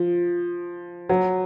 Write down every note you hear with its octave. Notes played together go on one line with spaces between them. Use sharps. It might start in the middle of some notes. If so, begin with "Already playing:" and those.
Already playing: F3
F#3